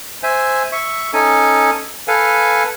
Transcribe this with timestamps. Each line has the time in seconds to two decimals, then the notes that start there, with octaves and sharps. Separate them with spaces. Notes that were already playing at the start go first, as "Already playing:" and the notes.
0.23 C5 E5 G#5
0.72 E5 C#6
1.13 C#4 D#4 A4 G#5
2.08 A4 B4 F5 G#5